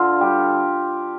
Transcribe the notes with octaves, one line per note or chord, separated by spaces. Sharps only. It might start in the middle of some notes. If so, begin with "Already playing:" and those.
Already playing: D3 F4 A4
G3 G4